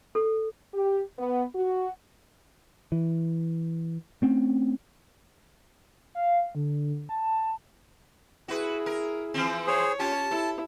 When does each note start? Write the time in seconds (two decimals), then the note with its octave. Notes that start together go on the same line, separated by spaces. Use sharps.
0.15 A4
0.74 G4
1.19 B3
1.54 F#4
2.92 E3
4.22 A3 C4 C#4
6.15 F5
6.55 D3
7.09 A5
8.48 E4 F#4 G#4 B4
8.86 A#4
9.34 E3 F3 C4
9.67 G#4 C5 C#5
9.99 C#4 F4 G4 A5
10.31 E4 A4